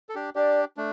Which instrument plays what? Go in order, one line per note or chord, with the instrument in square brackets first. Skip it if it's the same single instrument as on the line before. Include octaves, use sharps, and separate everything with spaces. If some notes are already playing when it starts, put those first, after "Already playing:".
[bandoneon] A4
D4 G4
[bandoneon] D4 G4 [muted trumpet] D5
[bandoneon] A3 D4